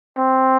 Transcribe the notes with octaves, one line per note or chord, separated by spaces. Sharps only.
C4